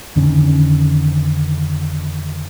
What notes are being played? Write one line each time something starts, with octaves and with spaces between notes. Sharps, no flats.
F2 D3 D#3 C#4